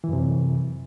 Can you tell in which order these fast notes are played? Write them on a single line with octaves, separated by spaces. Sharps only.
E3 F#2 C3